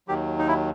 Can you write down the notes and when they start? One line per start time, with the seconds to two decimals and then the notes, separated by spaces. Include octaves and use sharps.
0.08 D#2 D#3 F#3 G4
0.39 D#4
0.48 E4